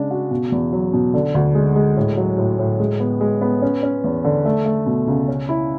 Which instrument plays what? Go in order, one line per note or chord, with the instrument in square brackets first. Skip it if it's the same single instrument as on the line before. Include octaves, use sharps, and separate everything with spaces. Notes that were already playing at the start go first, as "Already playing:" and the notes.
Already playing: [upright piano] C#3 G#3 D4
F#4
B2
E2
F#3
B2
D3
D2
G#3
G#3
A2
F#3
A2
A2
G#3
B3
G#3
B3
C#4
C#4
E2
D3
A3
A3
B2
C#2
C#4
E4